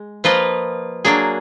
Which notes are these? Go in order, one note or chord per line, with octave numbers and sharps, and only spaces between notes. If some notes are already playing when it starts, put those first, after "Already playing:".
Already playing: G#3
F3 A#3 F4 B4 D#5
F#3 A#3 D4 G#4